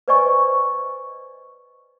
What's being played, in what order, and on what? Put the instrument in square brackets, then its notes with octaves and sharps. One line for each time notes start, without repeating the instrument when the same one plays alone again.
[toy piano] B4 C5 D5 D#5 G#5 C#6